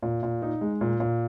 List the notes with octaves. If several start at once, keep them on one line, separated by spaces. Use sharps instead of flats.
A#2
A#2
D#4
G#3
A#2
A#2